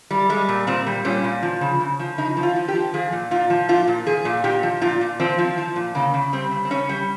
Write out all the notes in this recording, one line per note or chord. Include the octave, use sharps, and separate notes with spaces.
G3
G3 G#3
A#2
A#2 C4
G3
A#2 C#4
A#2
F3
C#3
C#3
F3
C#3 D#4
F3
F4
F3
G4
F3
F3 G#4
A#2
A#2 F4
F3
A#2 F4
A#2
F3 G#4
A#2
A#2 G4
F3
A#2 F4
A#2
F3 C4
F3
F3
A#2
C#3 A#3
C#3
G3 C4
C#3
C4
C#3 C#4
G3